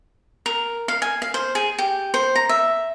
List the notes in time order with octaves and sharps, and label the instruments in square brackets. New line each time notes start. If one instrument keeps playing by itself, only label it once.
[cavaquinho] A#4
F5
G#5
F5
C5
G#4
G4
C5
A#5
E5